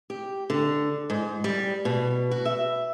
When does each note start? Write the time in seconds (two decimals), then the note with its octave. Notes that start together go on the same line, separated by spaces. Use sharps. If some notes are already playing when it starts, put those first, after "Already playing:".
0.10 G4
0.50 D3
1.10 G#2
1.44 G3
1.85 B2
2.31 F#4
2.45 E5